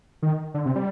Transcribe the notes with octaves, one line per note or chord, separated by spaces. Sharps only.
D#3
D3
C3
G3